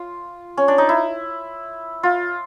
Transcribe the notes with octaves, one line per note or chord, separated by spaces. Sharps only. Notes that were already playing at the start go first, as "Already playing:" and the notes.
Already playing: F4
C#4
D4
D#4
E4
F4